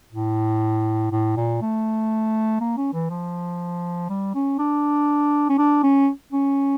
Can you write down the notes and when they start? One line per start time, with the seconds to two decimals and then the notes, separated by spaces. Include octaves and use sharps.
0.13 A2
1.12 A2
1.37 A#2
1.62 A3
2.61 A#3
2.77 C#4
2.93 E3
3.10 F3
4.10 G3
4.35 C#4
4.59 D4
5.50 C#4
5.59 D4
5.83 C#4
6.33 C#4